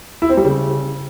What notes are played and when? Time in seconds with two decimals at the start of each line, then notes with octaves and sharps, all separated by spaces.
0.22 E4
0.30 C4
0.37 G3
0.45 C#3